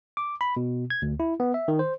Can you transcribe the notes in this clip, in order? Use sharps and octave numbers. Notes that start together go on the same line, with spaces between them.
D6
B5
B2
G#6
D2
E4
B3
E5
D#3
C5